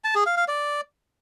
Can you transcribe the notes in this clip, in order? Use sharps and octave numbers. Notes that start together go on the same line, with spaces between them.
A5
G#4
F5
F5
D5